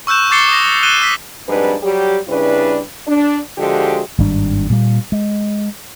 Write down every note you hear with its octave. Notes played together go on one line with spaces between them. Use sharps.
C#6 E6 F#6 G6 E7
C#6 D6 A6 C7 C#7 G7
D#6 A#6
F#6 D#7 E7 G7
E6 B6
F2 G#2 G3 D4 B4
F#3 G3 G4
C#3 G3 D4 E4 B4
D4
D3 F3 G#3 F#4 G4
G#1 G2 G3 D4
A#2 G3 A#3
G#3